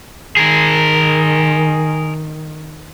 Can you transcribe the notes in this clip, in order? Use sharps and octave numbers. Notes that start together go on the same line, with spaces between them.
D#3 G#4 A#4